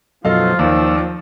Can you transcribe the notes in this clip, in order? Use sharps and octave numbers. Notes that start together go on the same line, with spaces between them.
F#2 B2 F3 F#3 F4 A4 D#5 F5
D#2 D#3 A#3 D5 E6